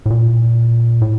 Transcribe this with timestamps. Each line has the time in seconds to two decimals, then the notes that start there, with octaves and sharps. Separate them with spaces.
0.06 A2
0.10 A#2
1.02 A2